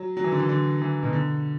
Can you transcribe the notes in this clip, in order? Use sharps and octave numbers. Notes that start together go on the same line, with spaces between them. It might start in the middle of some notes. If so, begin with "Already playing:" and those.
Already playing: F#3
F#3
E3
D3
E3
D3
E3
B2
D3